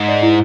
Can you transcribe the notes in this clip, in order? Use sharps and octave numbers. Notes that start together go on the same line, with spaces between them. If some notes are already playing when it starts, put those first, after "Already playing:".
Already playing: G#2
D5
E4